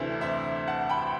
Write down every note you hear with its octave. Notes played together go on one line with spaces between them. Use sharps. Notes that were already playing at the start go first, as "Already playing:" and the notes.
Already playing: D2 C3 E3 A3 D4 C5 E5
C5 E5
F#5 A5
G5 B5